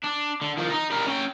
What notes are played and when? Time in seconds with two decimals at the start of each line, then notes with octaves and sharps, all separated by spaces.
0.03 D4
0.41 D3
0.57 D#3 F3
0.70 D#4 D#5
0.90 G3 A#4
1.06 C#4 G5